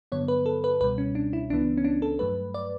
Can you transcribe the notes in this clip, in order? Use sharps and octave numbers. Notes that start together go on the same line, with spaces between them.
G2 D3 F#3 B3 C#5
B4
A4
B4
C#2 B2 G3 B4
C#4
D4
E4
C#2 C#3 E3 B3 D4
C#4
D4
A4
G2 F#3 A3 B4
D5